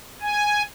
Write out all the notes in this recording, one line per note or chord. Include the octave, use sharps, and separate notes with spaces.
G#5